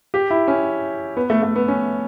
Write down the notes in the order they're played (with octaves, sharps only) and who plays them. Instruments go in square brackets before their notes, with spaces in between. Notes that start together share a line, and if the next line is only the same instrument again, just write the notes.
[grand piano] G4
E4
C#4
B3
A3
A3
B3
C#4